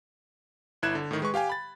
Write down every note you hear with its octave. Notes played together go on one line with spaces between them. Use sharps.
G1 E4 F#6 G#6 E7
D3
A2 D#3
G#3 B4 C#6
G4 F5 G5 G#5
B5 A6